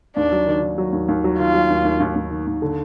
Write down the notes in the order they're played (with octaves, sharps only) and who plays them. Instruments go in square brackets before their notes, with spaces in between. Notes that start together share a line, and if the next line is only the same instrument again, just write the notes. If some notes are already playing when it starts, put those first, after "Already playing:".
[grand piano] D#2 [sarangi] D4
[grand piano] F#3
D#3
D#3
F#3
D#2
D#2
F#3
[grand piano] D#3 [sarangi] F4
[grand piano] F#3
D#2
D#2
D#2
D#2
D#3
D#2
D3